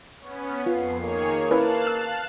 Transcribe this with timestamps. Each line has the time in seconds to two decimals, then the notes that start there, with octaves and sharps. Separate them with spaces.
0.19 B3 C#4
0.66 F2 B3 F4 C7
1.01 D#3 A#3 G#4 C#5
1.51 C#4 E4 B4 F5 A5 F#6
1.87 E6